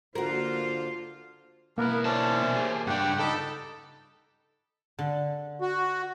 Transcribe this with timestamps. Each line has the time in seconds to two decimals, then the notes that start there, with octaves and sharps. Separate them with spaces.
0.15 D3 A#3 F4 F#4 A#4 C5 F5
1.78 B1 A#3 B3 E4 A#4
2.05 C#4 C5 D5 E5 A5
2.42 B2
2.56 G4 G#4
2.87 C#2 G2 D4 G4 F#5 G5
3.19 D#4 A4 B5 D6
4.99 D3
5.61 F#4